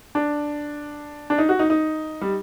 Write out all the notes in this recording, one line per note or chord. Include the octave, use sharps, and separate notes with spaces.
D4
D4
D#4
F#4
D#4
D#4
G3